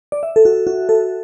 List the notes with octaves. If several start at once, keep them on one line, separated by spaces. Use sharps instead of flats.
D5
E5
A4
F#4
F#4
A4